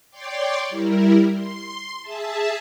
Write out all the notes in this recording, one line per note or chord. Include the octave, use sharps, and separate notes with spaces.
C#5 D5 G5 C6 D6
G3 E4 A#4
C6
G#4 E5 A5